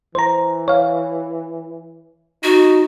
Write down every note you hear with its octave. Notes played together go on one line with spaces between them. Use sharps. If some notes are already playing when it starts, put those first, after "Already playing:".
E3 C5 A#5
C#5 F5
D#4 F#4